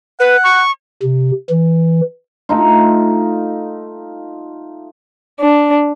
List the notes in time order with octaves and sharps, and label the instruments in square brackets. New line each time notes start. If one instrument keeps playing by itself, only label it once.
[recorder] B4 [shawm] F#5
[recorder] C#6
[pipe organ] C3
E3
[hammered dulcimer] A3 D#4 F4
[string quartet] D4